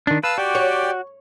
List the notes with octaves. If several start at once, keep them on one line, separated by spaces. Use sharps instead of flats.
D#3 D4
B4 F5 A5 E6
F#4 G4 D5 G5
C#5